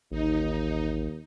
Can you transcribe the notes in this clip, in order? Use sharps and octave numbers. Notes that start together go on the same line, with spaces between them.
A1 D#2 D#4